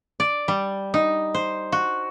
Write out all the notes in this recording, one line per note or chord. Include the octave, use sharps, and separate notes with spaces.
D5
G3
D#4
C5
F#4